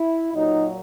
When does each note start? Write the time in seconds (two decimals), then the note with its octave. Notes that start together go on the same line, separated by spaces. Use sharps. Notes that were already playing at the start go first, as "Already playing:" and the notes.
Already playing: E4
0.34 A#2 F#3 D#4